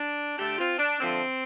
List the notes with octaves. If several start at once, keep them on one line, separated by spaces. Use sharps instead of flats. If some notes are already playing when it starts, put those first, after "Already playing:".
Already playing: D4
D3 A3 D4 G4
C4 F4
D4
D3 F3 A3 C4